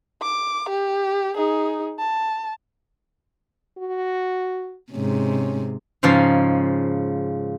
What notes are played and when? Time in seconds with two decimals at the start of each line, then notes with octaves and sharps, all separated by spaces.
0.23 D6
0.69 G4
1.36 D#4 G#4
1.99 A5
3.78 F#4
4.92 G#2 C3 C#4
6.03 G#2 C#3 F3 F5